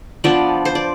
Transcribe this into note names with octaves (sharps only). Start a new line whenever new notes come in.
F3 B3 D4 D5
C5
D5